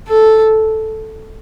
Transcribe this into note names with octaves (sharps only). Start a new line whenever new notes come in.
A4